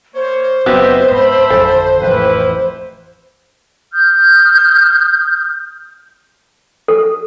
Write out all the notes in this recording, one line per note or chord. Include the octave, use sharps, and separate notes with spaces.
A#3 C5 C#5
F#1 B3 C4 F#4 G4 B4 D#5 E5
G#2 E5 A5 B5
G#1 F2 D3 A4
A1 F2 A2 A#3 E4 B4
D#6 F6 G6
A4